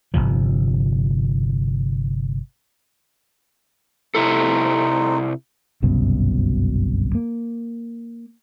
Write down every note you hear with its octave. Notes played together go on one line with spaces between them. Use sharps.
G1 C2 C3 F3
C3 A3 C4 D#4 E4 A4
G1 C2 F#2 B2
A#3